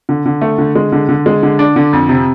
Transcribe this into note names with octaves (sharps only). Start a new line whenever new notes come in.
D3
D3
A3
D3
G#3
D3
D3
G#3
D3
D4
D3
F2
C3